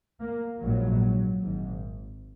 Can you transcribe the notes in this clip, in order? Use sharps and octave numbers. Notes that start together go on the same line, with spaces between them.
A#3
A#1 G#2 F#3
G#1 G#2